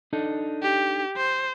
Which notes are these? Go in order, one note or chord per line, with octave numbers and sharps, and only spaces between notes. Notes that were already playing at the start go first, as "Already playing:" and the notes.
D4 D#4 A4
G4
C5